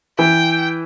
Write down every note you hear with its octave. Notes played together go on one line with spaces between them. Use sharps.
E3 G5